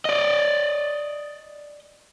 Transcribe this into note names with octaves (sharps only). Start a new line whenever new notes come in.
D5 D#5